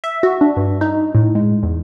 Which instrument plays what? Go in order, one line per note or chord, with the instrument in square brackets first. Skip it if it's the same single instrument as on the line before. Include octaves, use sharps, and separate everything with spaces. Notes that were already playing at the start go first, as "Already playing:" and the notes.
[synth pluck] E5
F#4
D4
G2
D#4
A2
G#3
E2